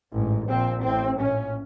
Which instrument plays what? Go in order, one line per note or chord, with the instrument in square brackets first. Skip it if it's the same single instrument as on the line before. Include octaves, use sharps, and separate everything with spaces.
[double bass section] A1 G#2
A#1 A#2 C4
A1 A2 C4
A#1 A2 C#4